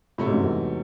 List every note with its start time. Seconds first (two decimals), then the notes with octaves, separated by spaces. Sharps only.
0.18 A2 C3 F#3 A3
0.26 G#2
0.33 F#2
0.41 E2 G#2